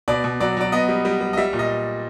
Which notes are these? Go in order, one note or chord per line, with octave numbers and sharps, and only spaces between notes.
B2 D5
B2
F#3 D5
F#3 D5
B3 D#5
G3
G3
G3
D#5
G3 E5
A#2
D#5